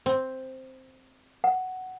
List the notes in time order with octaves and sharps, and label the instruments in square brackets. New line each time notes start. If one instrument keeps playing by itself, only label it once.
[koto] C4
[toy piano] F#5